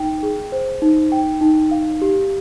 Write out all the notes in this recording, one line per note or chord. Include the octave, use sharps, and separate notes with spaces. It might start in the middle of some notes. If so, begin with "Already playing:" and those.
Already playing: D#4 G5
G#4
C5
D#4
G5
D#4
F5
G4